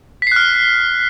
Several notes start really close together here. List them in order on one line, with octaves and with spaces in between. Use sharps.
B6 C7 F#6 F6